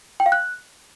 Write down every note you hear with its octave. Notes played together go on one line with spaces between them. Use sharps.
G5
F5
F#6